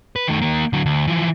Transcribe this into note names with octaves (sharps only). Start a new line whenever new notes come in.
B4
D#3 A3
D#3 A#3
D3 F#3
D2
E3 F3